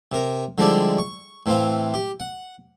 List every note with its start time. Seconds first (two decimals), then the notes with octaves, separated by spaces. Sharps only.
0.12 C3 A#4
0.58 D3 F3 G3 G#3 D4 E4
0.98 C#6
1.46 A2 E3 C4 F5
1.94 G4
2.20 F#5